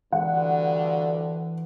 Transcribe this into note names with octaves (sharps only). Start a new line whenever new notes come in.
D2 G2 D3 E3 F#5